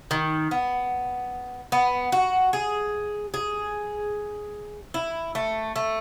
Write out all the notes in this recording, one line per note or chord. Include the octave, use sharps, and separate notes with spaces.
D#3
B3
B3
F#4
G#4
G#4
E4
A3
A3